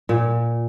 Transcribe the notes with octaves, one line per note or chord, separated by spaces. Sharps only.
A#2